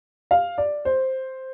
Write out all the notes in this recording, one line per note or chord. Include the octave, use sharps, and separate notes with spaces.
F5
D5
C5